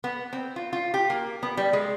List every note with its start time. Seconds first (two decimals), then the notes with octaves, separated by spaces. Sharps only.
0.04 B3
0.33 C4
0.56 F4
0.73 F4
0.94 G4
1.10 A#3
1.43 B3
1.57 G3
1.73 G#3